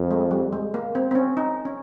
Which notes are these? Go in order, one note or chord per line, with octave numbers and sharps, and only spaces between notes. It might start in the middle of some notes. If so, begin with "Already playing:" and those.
Already playing: F2
G#3
G3
G#3
A#3
C4
C4
C#4
D#4
C#4